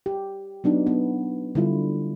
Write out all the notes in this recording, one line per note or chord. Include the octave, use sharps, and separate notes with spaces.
G4
F#3 B3 D4 D#4
B3
D3 G3 E4 F4